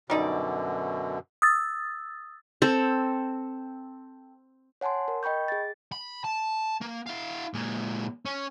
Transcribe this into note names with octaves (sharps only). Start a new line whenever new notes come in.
F#2 B2 D3 G3 D#4 D5
D#6 E6 A6
C4 A4
C#5 F#5 G#5 A5 C6
A#4
D#5 G5 B5 C#6 G6
G#4 A6
B5
A5
A#3
E4 F5
A#2 G#3
C#4